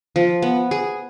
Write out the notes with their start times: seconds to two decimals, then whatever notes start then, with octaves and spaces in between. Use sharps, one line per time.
0.16 F3
0.42 B3
0.71 G#4